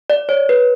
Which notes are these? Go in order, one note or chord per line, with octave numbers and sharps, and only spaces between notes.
D5
C#5
B4